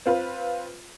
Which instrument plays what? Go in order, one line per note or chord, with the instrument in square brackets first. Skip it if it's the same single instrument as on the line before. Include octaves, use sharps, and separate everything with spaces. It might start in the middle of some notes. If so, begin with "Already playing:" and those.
[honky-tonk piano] C4 F4 B4